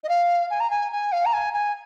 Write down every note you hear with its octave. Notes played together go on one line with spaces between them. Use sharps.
D#5
F5
G#5
A#5
G#5
G#5
F5
A#5
G#5
G#5